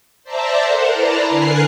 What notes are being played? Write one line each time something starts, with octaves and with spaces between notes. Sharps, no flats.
C5 D5 E5 A5 A#5
A4 A#4 C5 F#5
E4 B4 D5 A5 A#5 C6
D3 A#4 G#5 F6 F#6 C7